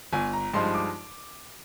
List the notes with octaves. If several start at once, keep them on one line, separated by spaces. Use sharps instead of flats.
G1 G#5
A#5
G2 F3 G#3 D#4 C6
D6